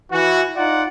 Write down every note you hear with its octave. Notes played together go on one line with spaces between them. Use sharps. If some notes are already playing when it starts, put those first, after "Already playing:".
E3 F#4
D#4 F4 D5 F#5